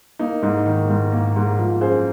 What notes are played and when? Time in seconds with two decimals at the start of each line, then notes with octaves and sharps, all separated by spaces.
0.19 A#3 D#4
0.42 G#2 D#4
0.66 D#3
0.90 G#2
1.12 A#3
1.36 G#2
1.59 F3 F4
1.81 F#2 G#4 C5